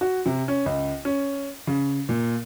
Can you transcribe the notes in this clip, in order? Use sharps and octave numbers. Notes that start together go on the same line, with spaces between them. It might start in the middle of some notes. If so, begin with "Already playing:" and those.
F#4
C3
C#4
C#2
C#4
C#3
A#2